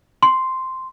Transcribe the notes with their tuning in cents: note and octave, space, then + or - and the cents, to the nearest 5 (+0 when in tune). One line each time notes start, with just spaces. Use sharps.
C6 -5